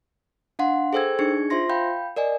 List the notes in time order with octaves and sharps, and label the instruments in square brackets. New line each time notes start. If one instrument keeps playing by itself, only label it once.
[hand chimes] D4 F5 F#5 C6
G#4 A4 C5 G5 E6 G#6
D4 D#4 G#4 C#6 G#6 C#7
F4 C5 E5 C6 A#6
F5 G5 B5 G6
A#4 D5 D#5 G#5